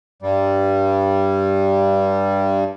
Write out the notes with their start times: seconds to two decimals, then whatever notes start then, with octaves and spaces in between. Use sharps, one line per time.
0.22 G2 G3